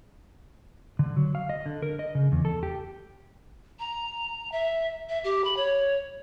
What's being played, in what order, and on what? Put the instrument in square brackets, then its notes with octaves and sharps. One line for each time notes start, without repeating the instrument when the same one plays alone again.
[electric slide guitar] D3
F#3
F5
D#5
D3
A#4
D#5
C#3
E2
A4
G4
[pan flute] A#5
E5
E5
G4
B5
C#5